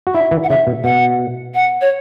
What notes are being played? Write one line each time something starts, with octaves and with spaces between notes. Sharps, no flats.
F#4
E4 E5
E3
F#5
C#3 E5
B2
B2 F#5
F#5
C#5